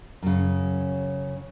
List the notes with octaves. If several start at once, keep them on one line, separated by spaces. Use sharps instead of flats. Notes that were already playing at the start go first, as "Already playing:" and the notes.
F#2 C#3